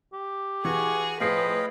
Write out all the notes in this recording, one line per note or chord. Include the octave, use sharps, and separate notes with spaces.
G4
E3 F#4 G#4 C#6
A2 F3 G#4 B4 D#5 F5 G5 C7